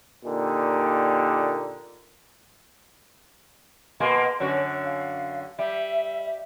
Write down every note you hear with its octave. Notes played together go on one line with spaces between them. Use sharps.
A#2 D3 A#3 D#4 G4
B2 A#3 G#4 C6
F#2 D3 F#4 C#5
F5
G3 E5
E5